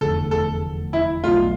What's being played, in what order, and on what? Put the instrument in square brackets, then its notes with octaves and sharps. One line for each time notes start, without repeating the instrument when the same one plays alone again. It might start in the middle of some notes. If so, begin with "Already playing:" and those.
[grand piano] F1 E2 D3 A3 D4 [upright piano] A4
[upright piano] A4
E4
[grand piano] B1 B2 A3 [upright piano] F4